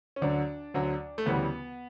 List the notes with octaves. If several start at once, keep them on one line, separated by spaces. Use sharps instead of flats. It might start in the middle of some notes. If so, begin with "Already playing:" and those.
C#4
D2 D3 F#3 D4
D2 D3 F#3
A3
D2 C#3 E3 G3 B3